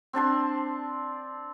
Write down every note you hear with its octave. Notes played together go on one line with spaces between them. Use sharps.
C4 D4 A5 C6